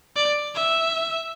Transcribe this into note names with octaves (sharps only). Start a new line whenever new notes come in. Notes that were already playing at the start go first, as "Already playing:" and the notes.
D5
E5